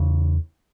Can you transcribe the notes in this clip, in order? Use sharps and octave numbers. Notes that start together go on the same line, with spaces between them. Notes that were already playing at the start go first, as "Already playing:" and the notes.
Already playing: E2 C#3